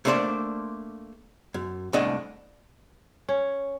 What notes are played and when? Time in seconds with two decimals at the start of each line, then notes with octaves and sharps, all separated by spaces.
0.05 A3 A#3 D4 G#4 C5 D5
1.54 F#2
1.93 C2 A3 D4 D#5 F#5
3.29 C#4